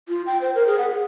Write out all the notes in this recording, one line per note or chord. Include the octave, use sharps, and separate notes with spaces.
F4
G5
C5
A#4
G#4
F#5
G#4